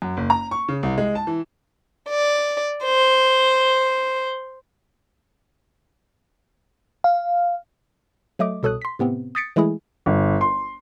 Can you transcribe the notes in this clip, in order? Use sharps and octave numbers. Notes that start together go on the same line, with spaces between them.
F#2
F#1
A#5
C#6
C#3
C2
G#3
A5
E3
D5
C5
F5
F#3 A3 D#5 D6
C2 B2 A4 C#5 D#6 F#6
C6 B6
A2 C3 B3 C4
D#6 G6 A6 B6 C#7 D7
E3 G#3 A3 E4 G#4
G1
C6